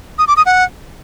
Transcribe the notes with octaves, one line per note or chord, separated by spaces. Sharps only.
D#6
D6
D#6
F#5